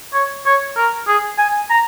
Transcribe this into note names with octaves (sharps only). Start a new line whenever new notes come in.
C#5
C#5
A#4
G#4
G#5
A#5